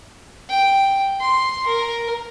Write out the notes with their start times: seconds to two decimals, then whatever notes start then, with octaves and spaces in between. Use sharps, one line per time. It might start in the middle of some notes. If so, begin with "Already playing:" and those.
0.50 G5
1.20 C6
1.67 A#4